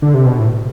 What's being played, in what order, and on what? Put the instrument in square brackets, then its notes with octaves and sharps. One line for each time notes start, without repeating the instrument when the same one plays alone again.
[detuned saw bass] D3
C3
B2
A2